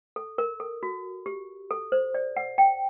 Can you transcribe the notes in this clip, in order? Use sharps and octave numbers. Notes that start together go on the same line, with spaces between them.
A4
A#4
A4
F#4
G4
A4
C5
D5
F#5
G5